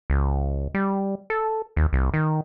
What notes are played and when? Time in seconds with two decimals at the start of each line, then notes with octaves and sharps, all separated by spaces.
0.10 C#2
0.74 G3
1.30 A4
1.76 D#2
1.93 C2
2.14 D#3